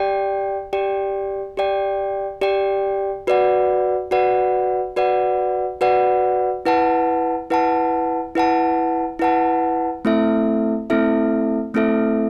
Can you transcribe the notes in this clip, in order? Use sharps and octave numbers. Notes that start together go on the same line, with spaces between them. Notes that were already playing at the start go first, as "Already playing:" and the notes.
Already playing: G4 D5 G5
G4 D5 G5
G4 D5 G5
G4 D5 G5
F#4 B4 D5 F#5
F#4 B4 D5 F#5
F#4 B4 D5 F#5
F#4 B4 D5 F#5
E4 B4 F#5 A5
E4 B4 F#5 A5
E4 B4 F#5 A5
E4 B4 F#5 A5
A3 C4 E4 A4 E5
A3 C4 E4 A4 E5
A3 C4 E4 A4 E5